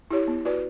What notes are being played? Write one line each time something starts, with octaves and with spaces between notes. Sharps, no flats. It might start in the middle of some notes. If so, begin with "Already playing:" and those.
E4 G4 C#5
B3
F#4 B4 D5